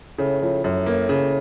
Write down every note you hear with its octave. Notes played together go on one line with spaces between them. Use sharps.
A2 C#3
A2 F3
F#2 A2
A#3
C#3